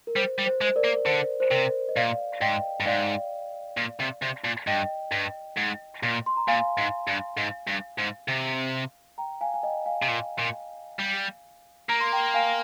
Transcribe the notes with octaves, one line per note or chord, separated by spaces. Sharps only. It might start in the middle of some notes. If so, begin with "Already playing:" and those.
A#4
G3 C5
G3
C5
G#3
C5
A#4 D5
A#3
D3 C5
C5
C3 A#4
D#5
A#2 D5 F5
G#2 D#5 G5
G2
G#2 D5 F5
A#2
C3
C3
A#2
G2 D#5 G5
G2
G#2
A#2
C6
A#5
A#2 F5 G#5
G#2
G2
G#2
G2
G#2
C3
G5 A#5
F5 G#5
G#5
D#5 G5
F5 G#5
C3
A#2
A#2
G3
A#3 A#5
C6
G5 A#5
F5 G#5